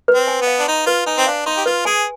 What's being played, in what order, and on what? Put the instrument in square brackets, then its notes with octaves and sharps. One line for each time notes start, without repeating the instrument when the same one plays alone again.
[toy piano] B4
[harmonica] C4
[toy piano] G#5
[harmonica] B3
[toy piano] F5
[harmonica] D4
[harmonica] D#4 [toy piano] C6
[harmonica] F4 [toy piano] B4
[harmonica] D#4 [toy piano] G#5
[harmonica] C4
[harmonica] D4 [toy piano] F5
[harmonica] D#4 [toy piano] C6
[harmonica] G4
[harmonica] F4 [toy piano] B4
[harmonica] G#4 [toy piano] G#5